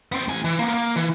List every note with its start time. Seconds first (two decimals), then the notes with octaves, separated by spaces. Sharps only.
0.12 B3 C4
0.28 A2 G#5
0.45 E3
0.59 A#3 B3
0.74 A#3
0.96 E3